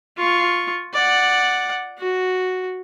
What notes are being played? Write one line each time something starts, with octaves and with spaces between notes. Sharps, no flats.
F4 C#6
D5 F#5
F#4